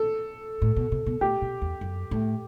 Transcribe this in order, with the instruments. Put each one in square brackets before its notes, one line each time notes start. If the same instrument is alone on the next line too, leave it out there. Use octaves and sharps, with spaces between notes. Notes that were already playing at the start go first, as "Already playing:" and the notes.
Already playing: [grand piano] A4
[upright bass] A2
B2
C3
B2
[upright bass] A2 [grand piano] G4
[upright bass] B2
E2
F#2
A2